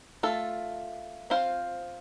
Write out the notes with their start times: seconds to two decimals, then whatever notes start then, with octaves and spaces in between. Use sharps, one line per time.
0.23 A3 F4 A4
1.30 C4 F4 C5 F5